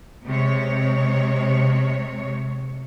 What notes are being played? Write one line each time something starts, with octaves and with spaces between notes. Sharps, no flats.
C3 G#3 C#5